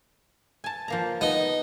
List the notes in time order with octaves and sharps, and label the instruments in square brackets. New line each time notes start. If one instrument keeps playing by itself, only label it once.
[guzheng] G#5 A5
F3 A#3 A#5
[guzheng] B3 [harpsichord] D#4